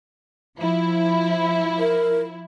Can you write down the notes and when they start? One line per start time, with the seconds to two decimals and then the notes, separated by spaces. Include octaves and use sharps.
0.58 F3 E4
1.79 A#4